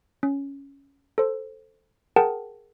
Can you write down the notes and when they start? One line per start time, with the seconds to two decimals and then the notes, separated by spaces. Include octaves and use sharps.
0.23 C#4
1.18 A4 C5
2.16 G#4 A#4 F#5 G5 A5